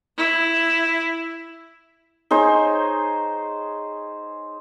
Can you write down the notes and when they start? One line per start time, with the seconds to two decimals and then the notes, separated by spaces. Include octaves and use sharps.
0.17 E4
2.31 D#4 G#4 C5 C#5